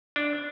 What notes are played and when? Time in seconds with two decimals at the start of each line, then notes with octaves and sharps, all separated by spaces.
0.16 D4